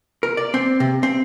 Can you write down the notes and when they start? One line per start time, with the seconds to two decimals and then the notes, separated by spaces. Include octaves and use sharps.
0.23 A#4
0.37 D5
0.54 C4
0.80 C3
1.03 C4